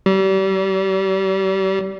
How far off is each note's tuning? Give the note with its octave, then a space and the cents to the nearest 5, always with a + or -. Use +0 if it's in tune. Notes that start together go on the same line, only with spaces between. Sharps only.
G3 -35